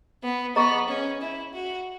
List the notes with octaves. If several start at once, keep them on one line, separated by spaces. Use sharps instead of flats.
B3
B3 G#4 D#5 A#5 C#6
C#4
E4
F#4